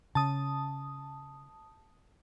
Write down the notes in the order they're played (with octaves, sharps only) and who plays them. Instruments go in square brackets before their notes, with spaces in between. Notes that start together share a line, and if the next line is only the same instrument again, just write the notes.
[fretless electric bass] C#3 [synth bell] A5 D#6